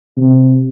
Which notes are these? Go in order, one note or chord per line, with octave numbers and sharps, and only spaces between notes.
C3